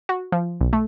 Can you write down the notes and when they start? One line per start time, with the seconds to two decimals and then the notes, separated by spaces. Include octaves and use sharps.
0.09 F#4
0.32 F3
0.61 B1
0.73 A3